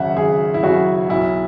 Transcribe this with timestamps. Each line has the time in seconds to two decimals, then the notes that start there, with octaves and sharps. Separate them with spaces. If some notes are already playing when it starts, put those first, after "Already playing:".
Already playing: G#1 F#2 C#3 E5 F#5
0.16 G#1 G#4
0.54 E4
0.63 F#2 C#3 F#4
1.09 B1 E4